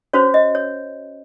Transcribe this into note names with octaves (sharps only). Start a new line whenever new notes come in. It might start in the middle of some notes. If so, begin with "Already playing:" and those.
C#4 F#4 C5 C#5
D#5
C#5